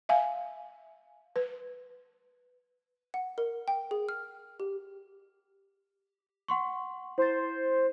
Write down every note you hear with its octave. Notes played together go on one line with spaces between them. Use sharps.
E5 F5 G#5
B4
F#5
A#4
G5
G#4
F6
G4
F#5 C6 C#6
E4 C5 A6